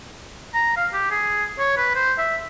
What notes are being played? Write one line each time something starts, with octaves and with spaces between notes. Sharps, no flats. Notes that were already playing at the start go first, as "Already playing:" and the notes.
A#5
F5
G4
G#4
C#5
B4
C5
E5